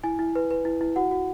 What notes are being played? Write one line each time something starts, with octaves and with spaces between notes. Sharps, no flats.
E4 G#5
E4
B4
B4
E4
E4
F#4 F#5
F#4